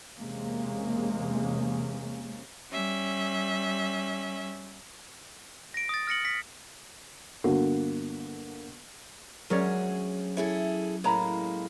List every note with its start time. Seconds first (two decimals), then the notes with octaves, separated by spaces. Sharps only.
0.18 E2 C3 G#3 A#3 C#4
2.71 G3 C#4 E5
5.74 A#6 D7
5.89 D#6 A6
6.07 F6 A#6 C#7 F#7
6.25 B6
7.44 G1 D3 A#3 F#4
9.50 D2 F#3 C#4 G#4 A#4 D5
10.37 E4 G#4 A4 C#5
11.04 A2 G#3 A#3 C#5 A#5 B5